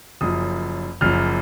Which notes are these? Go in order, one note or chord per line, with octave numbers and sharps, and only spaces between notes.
F#1 F#2 F3 D#6
F#1 F#2 F3 F6